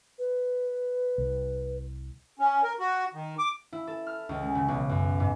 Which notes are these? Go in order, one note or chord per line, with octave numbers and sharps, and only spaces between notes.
B4
C2
C#4
A#4
F#4
D#3
D6
E4
A4
F6
C#2
G#3
C#3
B1
F#2
G#2